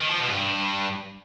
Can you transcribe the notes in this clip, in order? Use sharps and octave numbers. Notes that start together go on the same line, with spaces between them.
D#3
F3
B2
G2